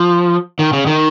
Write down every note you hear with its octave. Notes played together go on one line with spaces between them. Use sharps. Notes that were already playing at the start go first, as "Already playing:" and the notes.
Already playing: F3
D#3
C#3
D#3